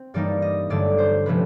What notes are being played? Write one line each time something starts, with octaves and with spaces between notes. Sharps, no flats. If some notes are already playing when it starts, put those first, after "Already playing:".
Already playing: C4
G2 E3 G3 A#3 D#4 D5
D#5
G2 D3 F#3 A3 D5
C5
C3 F3 A3 C#4 B4